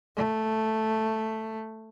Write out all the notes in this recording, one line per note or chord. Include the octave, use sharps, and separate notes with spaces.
A3